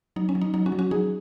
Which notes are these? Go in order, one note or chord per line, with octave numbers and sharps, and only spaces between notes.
F#3 D#4
C#4
F#3
D#4
F#3 D#4
C#4 F#4
F#3
C#4 F#4
F#3 D#4 G#4